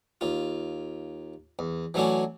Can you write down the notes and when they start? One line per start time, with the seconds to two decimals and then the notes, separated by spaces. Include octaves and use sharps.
0.21 D#2 F4
1.59 E2
1.94 E3 F#3 A3 C#4 D4 F#4